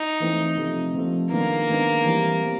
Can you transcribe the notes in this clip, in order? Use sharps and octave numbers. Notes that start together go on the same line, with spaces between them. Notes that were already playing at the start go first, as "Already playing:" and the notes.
Already playing: D#4
E3 A3 C4
C3 F3 A3
C3 F3 A3
D#3 G#3 A#3 B3 D4
D#3 G#3 B3 D4
E3 G3 C4
G3 C4